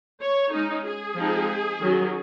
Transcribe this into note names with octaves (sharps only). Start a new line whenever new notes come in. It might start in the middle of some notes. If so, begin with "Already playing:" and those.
C#5
G#3 C#4 D#4
G#4
F3 G#3 C4 D#4
D#3 F#3 C#4